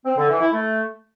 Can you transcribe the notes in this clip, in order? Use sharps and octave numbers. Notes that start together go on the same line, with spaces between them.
C4
D3
E3
E4
A3